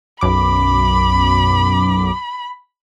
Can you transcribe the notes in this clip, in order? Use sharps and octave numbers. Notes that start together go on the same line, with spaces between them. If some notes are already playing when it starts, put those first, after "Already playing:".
B1 F#2 B5 D6